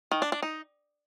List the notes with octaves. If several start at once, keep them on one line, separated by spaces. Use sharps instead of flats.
D#3
D4
D4
D#4